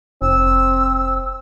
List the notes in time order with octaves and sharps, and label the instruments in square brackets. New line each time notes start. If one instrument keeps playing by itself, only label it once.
[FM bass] F1 [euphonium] C4 [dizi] E6